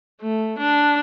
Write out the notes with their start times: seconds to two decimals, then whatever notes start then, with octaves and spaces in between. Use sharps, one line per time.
0.21 A3
0.58 D4